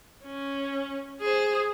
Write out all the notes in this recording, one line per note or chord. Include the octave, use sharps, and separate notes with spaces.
C#4
G#4 C5